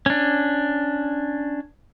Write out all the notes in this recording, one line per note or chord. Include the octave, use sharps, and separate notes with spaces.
C#4 D4